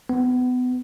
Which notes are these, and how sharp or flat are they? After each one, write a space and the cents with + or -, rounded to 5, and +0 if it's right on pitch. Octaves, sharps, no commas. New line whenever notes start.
B3 +25